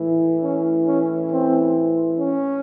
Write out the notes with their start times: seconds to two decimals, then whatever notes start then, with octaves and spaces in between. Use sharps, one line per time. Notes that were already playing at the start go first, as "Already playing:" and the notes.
Already playing: A2 E3
0.41 C#4
0.86 C#4
1.30 C4
2.19 C#4